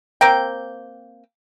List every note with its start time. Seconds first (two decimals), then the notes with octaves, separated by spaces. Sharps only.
0.21 A#3 C4 A#4 G5